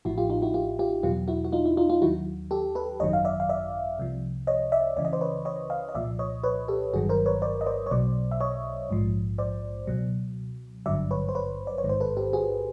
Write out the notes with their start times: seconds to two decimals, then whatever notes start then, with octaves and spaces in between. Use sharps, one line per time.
0.05 A1 A2 F3 E4 F#4
0.18 F4 G4
0.30 D#4 F4
0.42 E4 F#4
0.54 F4 G4
0.79 F4 G4
1.03 E2 B2 F#3 F4 G4
1.28 E4 F#4
1.45 F#4
1.52 D#4 F4
1.66 E4
1.77 D#4 F4
1.90 D#4 F4
2.01 D#2 D#3 F#3 E4 F#4
2.51 G4 A4
2.75 A4 B4
3.00 G#1 F#2 D#3 F#3 C#5 D#5
3.13 F5
3.25 D5 E5
3.40 F5
3.49 D5 E5
3.99 C2 C3 F3
4.47 C#5 D#5
4.72 D5 E5
4.96 C#2 C#3 E3 D5
5.05 D#5
5.13 C5 D5
5.21 B4 C#5
5.45 C#5 D#5
5.70 D#5 F5
5.89 D#5
5.95 C2 A#2 F3 D5 E5
6.19 C#5 D#5
6.43 B4 C#5
6.68 G4 A4
6.93 G1 G2 D#3 F#3 F#4 G#4
7.09 A#4 C5
7.26 B4 C#5
7.42 C5 D5
7.61 D#5
7.66 C5 D5
7.87 C#5
7.91 B1 B2 F#3 C5 D5
8.31 E5
8.41 C#5 D#5
8.89 A#1 G#2 F3
9.38 C5 D5
9.87 C#2 B2 F#3
10.86 G#1 G2 D3 F#3 D5 E5
11.11 B4 C#5
11.29 C5
11.35 B4 C#5
11.67 D5
11.78 C#5
11.84 A1 G#2 D#3
11.89 C5
12.00 A4 B4
12.17 G4 A4
12.33 F#4 G#4